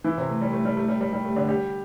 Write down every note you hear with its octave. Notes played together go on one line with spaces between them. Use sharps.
E3 E4
C3 C4
A3
G3
A3
G3
A3
G3
G3
G3
A3
D3 D4
G3 G4